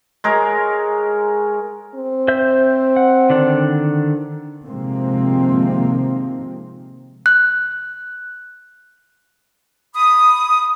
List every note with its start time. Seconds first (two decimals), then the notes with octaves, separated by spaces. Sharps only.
0.24 G#3 G#4 A#4 C#5
1.95 C4
2.28 C5 E5 G6
2.96 F#5
3.30 D3 D#3 D4
4.66 C3 D#3 F3 G#3 A#3 C4
7.26 F#6
9.95 B5 D#6